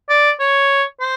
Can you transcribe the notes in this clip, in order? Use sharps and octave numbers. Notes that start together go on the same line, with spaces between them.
D5
C#5
C5